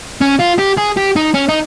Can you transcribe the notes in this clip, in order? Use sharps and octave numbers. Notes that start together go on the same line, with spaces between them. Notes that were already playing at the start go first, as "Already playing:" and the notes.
C#4
F4
G4
G#4
G4
D#4
C#4
D#4